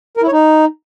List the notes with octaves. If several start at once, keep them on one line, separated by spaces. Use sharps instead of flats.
A#4
E4
C#5
D#4